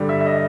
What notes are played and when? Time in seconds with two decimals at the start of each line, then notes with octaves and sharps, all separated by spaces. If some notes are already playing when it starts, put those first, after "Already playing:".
Already playing: G2 D3 G3
0.09 E5
0.20 E5
0.26 D#5